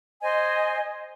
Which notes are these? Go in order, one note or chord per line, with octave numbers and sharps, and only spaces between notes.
C5 D#5 G#5